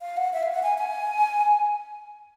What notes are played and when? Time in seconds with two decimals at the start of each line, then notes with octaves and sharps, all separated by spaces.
0.01 F5
0.17 F#5
0.33 E5
0.43 F5
0.52 F#5
0.63 G#5
0.78 G#5